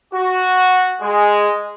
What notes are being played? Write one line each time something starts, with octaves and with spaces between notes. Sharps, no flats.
F#4
G#3